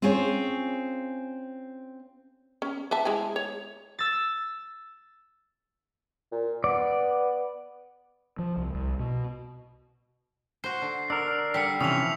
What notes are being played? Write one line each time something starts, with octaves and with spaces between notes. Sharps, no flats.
C4 C#4 F4 G#4 C5 C#5
C#4
B4 E5 A5
G#3 E4 G#5
C#5
E6 A6
A#2
B3 D5
F3
C2
C2
B2
F#4 C5 C7
D3
D4 A#4 E6
D3 G3 B6 C#7
C3 E3 F3 C#4 D#6 E6 F7